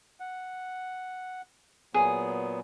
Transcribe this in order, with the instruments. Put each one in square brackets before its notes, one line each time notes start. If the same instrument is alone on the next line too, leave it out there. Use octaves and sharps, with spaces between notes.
[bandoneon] F#5
[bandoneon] A#2 F#3 B3 [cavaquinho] G#4